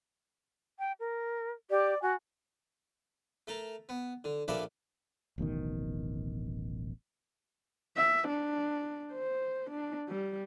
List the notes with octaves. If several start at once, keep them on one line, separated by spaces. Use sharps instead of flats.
G5
A#4
G4 D5
F#4 G#5
A3 A4 A#4
B3
D3
A#1 A#3 A4 B4 D5 E5
D1 A1 B2 D#3
E5
D4
C5
D4
G3